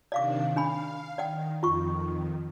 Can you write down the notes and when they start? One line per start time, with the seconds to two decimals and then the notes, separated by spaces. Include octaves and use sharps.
0.12 C3 D#3 D4 D5 F5 D6
0.56 D4 F5 G#5 B5
1.18 D#3 D5 F#5 G5
1.63 F2 D#3 F4 C#6